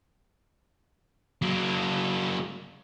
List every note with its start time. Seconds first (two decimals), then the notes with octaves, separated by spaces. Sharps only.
1.42 F#3 A#3